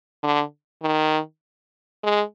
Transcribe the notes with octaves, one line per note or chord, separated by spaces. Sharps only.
D3
D#3
G#3